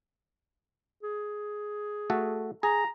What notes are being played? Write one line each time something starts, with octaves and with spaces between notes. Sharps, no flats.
G#4
A3 F#4 A4
G#4 A#5